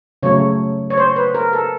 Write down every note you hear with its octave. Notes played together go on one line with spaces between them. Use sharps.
C#3 F#3 A3 C#5
C#5
C5
B4
A#4
A4